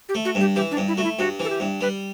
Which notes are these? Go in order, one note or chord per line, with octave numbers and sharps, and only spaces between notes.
G4
A3
F#4
G2
G4
E3 G4
D4
G2
E4
A3 F#4
E4
G2 F#4
E3 A4
G4
G2
G3 B4